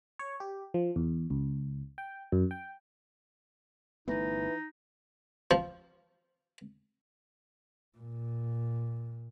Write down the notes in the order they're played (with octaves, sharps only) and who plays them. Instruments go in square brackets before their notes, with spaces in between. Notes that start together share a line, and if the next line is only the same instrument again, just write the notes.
[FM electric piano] C#5
G4
F3
E2
C#2
G5
F#2
G5
[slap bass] G1 A3 B3 [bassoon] E3 [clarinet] D#4
[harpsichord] F3
[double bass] A#2